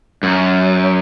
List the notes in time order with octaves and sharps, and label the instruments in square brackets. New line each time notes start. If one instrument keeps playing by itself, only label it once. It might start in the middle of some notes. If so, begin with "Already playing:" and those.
[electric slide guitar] F#2